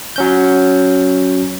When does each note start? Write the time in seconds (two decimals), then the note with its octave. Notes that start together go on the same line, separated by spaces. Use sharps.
0.16 F#3 C#4 G6